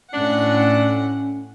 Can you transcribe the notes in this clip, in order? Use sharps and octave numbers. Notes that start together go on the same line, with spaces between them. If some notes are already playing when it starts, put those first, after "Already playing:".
A2 C#4 D4 F#5